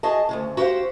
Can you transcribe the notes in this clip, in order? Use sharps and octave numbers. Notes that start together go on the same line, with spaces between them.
F#4 G#4 D#5 A5
D2 A#2 C#3
F#4 G4 A#4 C5 F5